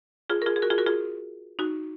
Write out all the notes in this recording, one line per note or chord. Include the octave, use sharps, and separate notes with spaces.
F4 G#4
A#4
F4 G#4
G#4
F#4 A#4
F4 G#4
F#4 A#4
F4 G#4
D#4 F#4